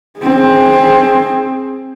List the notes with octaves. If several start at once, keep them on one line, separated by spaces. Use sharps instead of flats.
C4 G#4